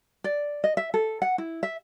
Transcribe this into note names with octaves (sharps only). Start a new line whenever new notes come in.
D5
D#5
E5
A4
F#5
E4
E5